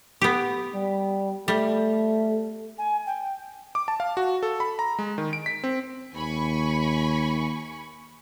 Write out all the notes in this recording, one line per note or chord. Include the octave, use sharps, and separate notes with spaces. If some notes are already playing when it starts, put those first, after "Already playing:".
B3 G4
G3
G3 A3
G#5
G5
D6
A5
F5
F#4
A4
B5
A#5
G#3
D#3
D7
B6
C4
D#2 G#5 B5 C#6